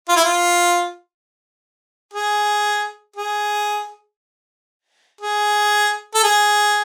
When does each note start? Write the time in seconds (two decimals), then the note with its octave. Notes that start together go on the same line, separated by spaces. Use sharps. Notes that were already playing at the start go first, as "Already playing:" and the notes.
0.09 F4
0.16 E4
0.24 F4
2.13 G#4
3.16 G#4
5.21 G#4
6.15 A4
6.23 G#4